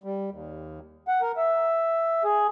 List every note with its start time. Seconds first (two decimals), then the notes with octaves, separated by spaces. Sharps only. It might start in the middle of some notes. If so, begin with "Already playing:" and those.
0.04 G3
0.30 D#2
1.08 F#5
1.22 A#4
1.37 E5
2.24 G#4